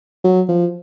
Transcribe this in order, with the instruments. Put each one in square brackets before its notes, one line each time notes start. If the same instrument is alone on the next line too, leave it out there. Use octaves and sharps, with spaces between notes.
[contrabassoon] F#3
F3